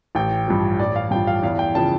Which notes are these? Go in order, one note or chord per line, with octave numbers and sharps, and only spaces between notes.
A1 G5
G2 F3
A1 D5
F5
G2 F3 G5
F5
E2 F5
G5
C#3 F3 A5